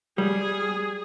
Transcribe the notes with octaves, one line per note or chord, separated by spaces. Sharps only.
G3 G#4